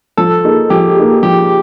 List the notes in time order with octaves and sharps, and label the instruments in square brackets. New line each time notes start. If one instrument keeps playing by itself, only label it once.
[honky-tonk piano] F3 [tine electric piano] A4
[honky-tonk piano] A#3 D#4 G#4
[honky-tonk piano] F3 [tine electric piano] G4
[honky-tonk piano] A#3 D#4 G#4
[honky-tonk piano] F3 [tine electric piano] G4